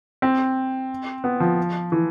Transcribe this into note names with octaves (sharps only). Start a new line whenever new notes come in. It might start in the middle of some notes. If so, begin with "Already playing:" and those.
C4
B3
F3
E3